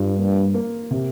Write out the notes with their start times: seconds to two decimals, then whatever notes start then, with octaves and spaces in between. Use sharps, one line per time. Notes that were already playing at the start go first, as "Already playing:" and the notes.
Already playing: G2 F4
0.18 A#3
0.54 A#3
0.91 C3